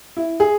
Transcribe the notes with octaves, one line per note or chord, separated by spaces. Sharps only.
E4
G#4